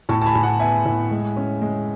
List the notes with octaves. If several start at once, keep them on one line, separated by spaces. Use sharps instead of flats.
A2 A5 C#6
A5
G#5 B5
A2
F#5 A5
B3 E5 G#5
A2
G#3
C#4
G#3